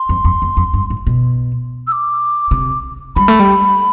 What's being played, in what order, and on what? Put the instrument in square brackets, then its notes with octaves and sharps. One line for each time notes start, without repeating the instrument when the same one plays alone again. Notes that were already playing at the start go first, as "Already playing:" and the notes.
Already playing: [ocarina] C6
[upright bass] F2
F2
E2
F2
G2
A2
B2
[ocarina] E6
D6
[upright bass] C3
[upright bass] G3 [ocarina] B5
[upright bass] A3
G3